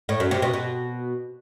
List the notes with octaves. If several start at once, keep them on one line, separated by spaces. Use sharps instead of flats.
A2
F#2
C3
B2
B2